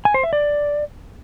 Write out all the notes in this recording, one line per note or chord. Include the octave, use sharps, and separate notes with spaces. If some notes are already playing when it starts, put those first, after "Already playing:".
G#5
C5
E5
D5